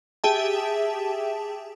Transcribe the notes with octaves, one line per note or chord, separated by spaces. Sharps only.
G4 G#4 E5 G5 A5